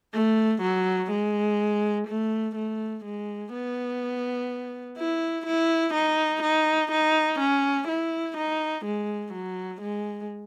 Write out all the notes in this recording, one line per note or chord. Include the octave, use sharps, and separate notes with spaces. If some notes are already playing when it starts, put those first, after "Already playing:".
A3
F#3
G#3
A3
A3
G#3
B3
E4
E4
D#4
D#4
D#4
C#4
E4
D#4
G#3
F#3
G#3